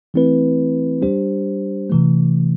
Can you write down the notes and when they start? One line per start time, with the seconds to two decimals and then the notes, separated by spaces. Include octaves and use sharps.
0.14 E3 A3 C4 E4 B4
1.02 G3 D4 G4 C5
1.90 C3 E3 A3